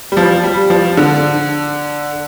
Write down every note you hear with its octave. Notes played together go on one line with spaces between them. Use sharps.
G3
F3
G3
F3
D3